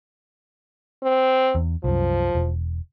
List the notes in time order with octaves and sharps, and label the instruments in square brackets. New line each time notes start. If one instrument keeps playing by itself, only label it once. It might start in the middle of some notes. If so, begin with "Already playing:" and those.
[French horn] C4
[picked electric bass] E2
[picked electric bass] C2 F#2 [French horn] F3
[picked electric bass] E1